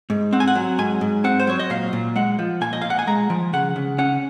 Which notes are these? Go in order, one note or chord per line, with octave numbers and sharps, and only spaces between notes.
G#2
C4 F#5
G#5
F#5
F#3
G#2 G#5
G#2
C4 F#5
C5
F#3 C#5
D#5
A#2 F5
A#2
G#3 F#5
F3
A#2 G#5
D#5
A#2 F5
F#5
G#5
G#3 A#5
F3
C#3 F#5
C#3
C#4 F#5